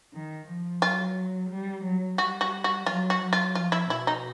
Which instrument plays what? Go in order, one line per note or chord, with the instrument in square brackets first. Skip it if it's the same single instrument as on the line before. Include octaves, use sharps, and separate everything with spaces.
[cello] D#3
F3
[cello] F#3 [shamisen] F4
[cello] G3
F#3
[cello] G3 [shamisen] F#4
[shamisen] F#4
F#4
[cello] F#3 [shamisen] F4
[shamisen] F#4
[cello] F#3
[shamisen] F4
[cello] F3 [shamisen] F4
[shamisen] E4
[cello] B2 [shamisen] E4
[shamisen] D#4